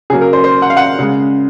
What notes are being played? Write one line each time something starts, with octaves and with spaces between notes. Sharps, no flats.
C#3 F#3 A#3 G#4
A#4
C5
C5
F#5
F5
F#5
C#3 G#3